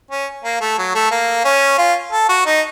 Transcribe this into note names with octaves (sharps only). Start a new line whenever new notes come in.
C#4
A#3
A3
F#3
A3
A#3
C#4
F4
A4
F#4
D#4